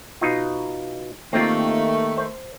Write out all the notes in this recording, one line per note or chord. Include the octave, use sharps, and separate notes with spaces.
B2 D#4 F4
D#3 A3 A#3 C4 F4 G4
C5